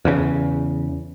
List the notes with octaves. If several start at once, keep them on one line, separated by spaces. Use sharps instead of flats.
E2 C#3